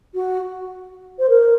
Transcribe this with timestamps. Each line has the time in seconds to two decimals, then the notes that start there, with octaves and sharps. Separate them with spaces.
0.15 F#4
1.19 C5
1.29 A#4